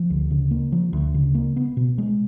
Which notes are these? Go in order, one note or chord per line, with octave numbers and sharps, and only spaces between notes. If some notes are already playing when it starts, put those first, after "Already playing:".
Already playing: F3
D2
C#3
A#3
F3
D2
C#3
A#3
B3
B2
G#3